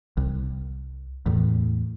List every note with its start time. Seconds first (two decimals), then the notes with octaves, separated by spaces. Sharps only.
0.17 C2
1.26 E2 A2